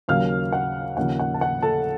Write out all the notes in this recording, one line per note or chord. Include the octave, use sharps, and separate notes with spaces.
D#2 C#3 F#3 A#3 F5 F6
F#5
D#2 C#3 F3 F#5
F#5
A5
F#5
A4 A5